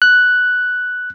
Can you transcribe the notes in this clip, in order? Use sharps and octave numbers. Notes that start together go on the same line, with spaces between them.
F#6